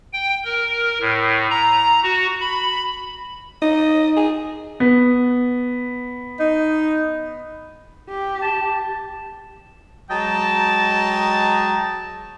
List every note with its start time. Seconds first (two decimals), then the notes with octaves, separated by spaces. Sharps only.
0.13 G5
0.45 A#4
1.01 A2
1.50 A#5
2.03 F#4
2.41 B5
3.62 D#4 D#5
4.16 G#4
4.80 B3
6.40 D#4
8.09 G4
8.42 A5
10.10 F#3 G#3 D#5 G5 A5 A#5